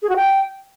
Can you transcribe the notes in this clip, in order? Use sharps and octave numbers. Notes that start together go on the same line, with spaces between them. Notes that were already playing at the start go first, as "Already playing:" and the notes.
G#4
F#4
G5